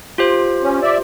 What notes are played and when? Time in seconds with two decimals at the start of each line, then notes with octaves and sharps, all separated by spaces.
0.18 F4 G4 C5
0.63 C#4
0.82 D5 E5